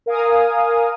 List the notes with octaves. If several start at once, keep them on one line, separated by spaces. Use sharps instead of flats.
A#4 F5 G#5 D#6